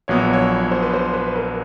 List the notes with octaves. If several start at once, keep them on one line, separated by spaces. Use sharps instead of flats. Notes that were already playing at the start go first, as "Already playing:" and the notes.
A#1 A#2 F#3 B3 C#5
C#5
C5
B4
C5
B4
A#4